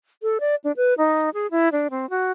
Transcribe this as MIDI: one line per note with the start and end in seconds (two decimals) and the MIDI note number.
0.23 0.38 69
0.40 0.55 74
0.64 0.72 62
0.77 0.94 71
0.98 1.30 63
1.34 1.47 68
1.51 1.69 64
1.72 1.88 62
1.91 2.09 60
2.10 2.32 66